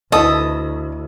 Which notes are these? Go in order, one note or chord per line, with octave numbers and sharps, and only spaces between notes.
D2 E4 A4 B4 D#5 D#6